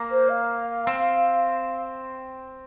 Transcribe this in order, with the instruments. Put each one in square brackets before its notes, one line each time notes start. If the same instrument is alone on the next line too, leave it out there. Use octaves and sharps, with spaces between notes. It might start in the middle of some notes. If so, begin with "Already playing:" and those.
Already playing: [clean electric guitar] A#3
[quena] C5
F5
[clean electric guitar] C4